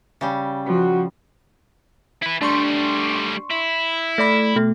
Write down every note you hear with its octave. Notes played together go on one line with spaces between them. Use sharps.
C#3 G3
F3 F#4
E4 B4
G3 A3 D4 C6 C#6
E4
A3 D5 B5
B2 A3